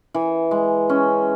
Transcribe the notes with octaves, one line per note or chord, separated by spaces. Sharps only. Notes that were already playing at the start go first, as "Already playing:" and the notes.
E3
G#3
C#4